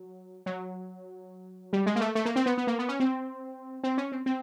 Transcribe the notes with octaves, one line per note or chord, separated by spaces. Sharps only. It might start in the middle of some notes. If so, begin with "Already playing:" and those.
Already playing: F#3
F#3
G3
G#3
A#3
A3
A3
A#3
C4
B3
B3
A#3
B3
C#4
C4
C4
C#4
C4
C4